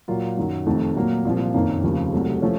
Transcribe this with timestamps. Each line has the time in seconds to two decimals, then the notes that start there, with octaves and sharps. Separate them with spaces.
0.08 A#2 F#3 A#3 F4
0.37 F#2 D#3 F#3
0.66 F1 F2 D#3 A3
0.96 A#2 F#3 A#3
1.25 C2 A#2 F3
1.54 F#1 F2 D#3 A#3 C#4
1.83 F1 D#2 C#3 F3
2.13 C2 C3 F#3 A3
2.42 F3 A3 C#4